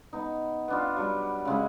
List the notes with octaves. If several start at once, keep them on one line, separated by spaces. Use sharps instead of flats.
B3 D#4
B3 D4 F4
F#3 G3
C#3 G#3 E4